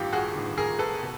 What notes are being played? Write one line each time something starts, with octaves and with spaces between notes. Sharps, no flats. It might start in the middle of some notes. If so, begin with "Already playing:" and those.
Already playing: A1 G2 D#3 F4 G4
F#4 G#4
A1 G2 D#3
G#4 A#4
A4 B4
B2